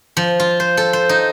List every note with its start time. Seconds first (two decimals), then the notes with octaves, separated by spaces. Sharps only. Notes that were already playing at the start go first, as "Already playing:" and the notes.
0.17 F3
0.40 F4
0.60 C5
0.77 A4
0.93 C5
1.09 D#4